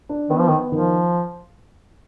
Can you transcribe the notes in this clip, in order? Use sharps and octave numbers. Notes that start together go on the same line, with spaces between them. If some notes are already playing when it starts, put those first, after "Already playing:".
D4
D#3 B3
F3
D#3
B3
D#3 F3